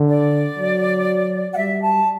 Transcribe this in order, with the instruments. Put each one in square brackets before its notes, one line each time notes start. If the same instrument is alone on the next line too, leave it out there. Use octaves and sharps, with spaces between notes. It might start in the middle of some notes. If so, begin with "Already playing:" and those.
Already playing: [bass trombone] D3
[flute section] D5
[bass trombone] F#3
[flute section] F#5
[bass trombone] G3 [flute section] E5
[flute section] A5